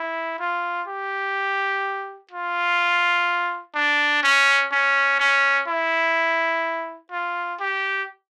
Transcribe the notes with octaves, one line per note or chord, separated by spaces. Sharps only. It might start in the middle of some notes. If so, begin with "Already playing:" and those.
Already playing: E4
F4
G4
F4
D4
C#4
C#4
C#4
E4
F4
G4